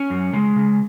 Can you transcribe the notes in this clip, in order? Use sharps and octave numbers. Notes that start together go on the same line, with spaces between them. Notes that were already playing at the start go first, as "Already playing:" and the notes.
Already playing: C#4
F#2
C#3 G#3
C#3